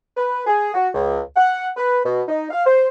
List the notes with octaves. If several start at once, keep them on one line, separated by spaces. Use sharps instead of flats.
B4
G#4
F#4
C#2
F#5
B4
B2
D#4
F5
C5